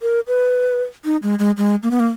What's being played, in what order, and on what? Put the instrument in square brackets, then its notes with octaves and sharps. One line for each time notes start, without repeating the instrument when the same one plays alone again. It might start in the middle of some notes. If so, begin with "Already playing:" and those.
[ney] A#4
B4
D#4
G#3
G#3
G#3
A#3
B3
A#3